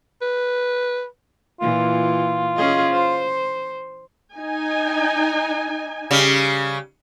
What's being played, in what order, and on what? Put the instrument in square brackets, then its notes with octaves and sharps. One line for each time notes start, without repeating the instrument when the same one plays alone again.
[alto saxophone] B4
[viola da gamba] A#2 E3 [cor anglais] F4
[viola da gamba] C#4 G#4 D#5
C5
[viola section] D#4 G#5
[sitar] C#3 G3